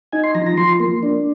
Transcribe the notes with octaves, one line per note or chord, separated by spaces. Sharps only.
D#4 G#5
C6
F3 A#5
A#5
F3 C6
A#3
D4